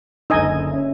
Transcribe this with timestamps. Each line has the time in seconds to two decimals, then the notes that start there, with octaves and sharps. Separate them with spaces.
0.30 F#1 D3 D#4 D#5 G#5 E6
0.71 C#4 E5